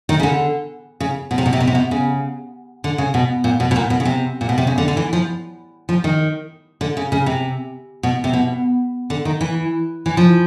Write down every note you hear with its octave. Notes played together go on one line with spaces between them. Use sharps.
D#3
C#3
D3
C#3
B2
C3
B2
C3
B2
C3
B2
C#3
D3
C#3
B2
A#2
B2
B2
A#2
B2
C#3
C3
A#2
B2
C3
C#3
D3
D3
E3
F3
F3
D#3
D3
C#3
C#3
C3
B2
C3
B2
D3
D#3
E3
E3
F3